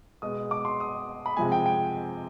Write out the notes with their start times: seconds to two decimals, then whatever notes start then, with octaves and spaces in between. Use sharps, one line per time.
0.22 B2 G#3 D#6
0.51 D6
0.65 C6
0.80 D#6
1.26 B5
1.37 C3 F3 G#3 G#5
1.52 G5
1.66 G5